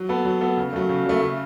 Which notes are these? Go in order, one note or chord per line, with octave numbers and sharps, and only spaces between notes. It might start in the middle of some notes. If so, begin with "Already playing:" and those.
Already playing: F#3
B3 A4
F#3
B3 A4
C#3
F#3 A3
C#3
F#3 A3
C#3